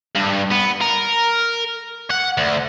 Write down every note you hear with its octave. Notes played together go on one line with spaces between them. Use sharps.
G2
B3
A#4
F#5
D2